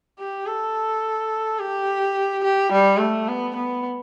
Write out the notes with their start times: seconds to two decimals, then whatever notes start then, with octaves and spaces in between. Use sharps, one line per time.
0.19 G4
0.47 A4
1.59 G4
2.44 G4
2.72 G3
2.99 A3
3.28 B3
3.55 B3